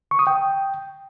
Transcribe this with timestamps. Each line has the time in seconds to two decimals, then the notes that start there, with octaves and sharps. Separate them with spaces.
0.11 C#6
0.19 D#6
0.27 G5